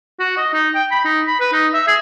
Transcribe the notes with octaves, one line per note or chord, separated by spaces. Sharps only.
F#4
D#5
D#4
G5
B5
D#4
B5
B4
D#4
E5
G#4